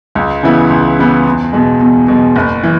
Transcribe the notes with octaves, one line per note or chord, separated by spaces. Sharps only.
C#2
C#3 E3 B3 E4
C#2
C#3 E3 B3 E4
E2
B2 G#3
E2
B2 G#3
F#1
E3